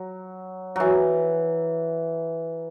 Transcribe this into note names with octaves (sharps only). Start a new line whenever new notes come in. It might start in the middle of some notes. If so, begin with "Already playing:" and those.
Already playing: F#3
E3 F#3